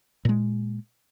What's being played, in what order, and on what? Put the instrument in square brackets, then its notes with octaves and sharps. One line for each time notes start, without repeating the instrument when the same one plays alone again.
[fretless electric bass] A#2 G#3